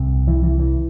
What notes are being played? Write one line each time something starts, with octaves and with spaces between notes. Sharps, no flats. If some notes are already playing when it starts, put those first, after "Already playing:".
Already playing: C2 C3
E3
E3
E3